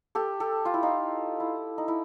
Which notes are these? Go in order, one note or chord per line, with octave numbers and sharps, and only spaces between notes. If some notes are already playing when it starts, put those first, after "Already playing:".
G4 A4
G4 A4
F4
E4
D#4 F4
E4
D#4
E4